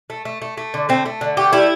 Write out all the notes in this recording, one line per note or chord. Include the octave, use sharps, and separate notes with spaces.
A3
A3
A3
A3
D3
A3 C4
A3
D3
A3 G4
G3 E4